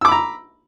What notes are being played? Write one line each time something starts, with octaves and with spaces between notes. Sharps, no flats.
A#5 B5 D6 E6